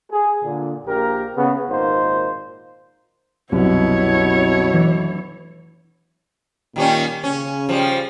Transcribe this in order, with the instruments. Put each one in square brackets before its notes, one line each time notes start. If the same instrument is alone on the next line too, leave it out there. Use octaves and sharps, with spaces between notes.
[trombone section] G#4
A#2 D3
A#1 A#3 G4 A#4
C#3 B3
G#1 A#2 A#3 D#4 C5
[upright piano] C2 [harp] F#2 [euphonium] B2 [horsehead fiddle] E4 C#5
[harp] E3 A3 D4
[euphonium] A#2 [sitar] D#3 G3 C#4
[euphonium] C#3 [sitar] C#4
[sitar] F3 G3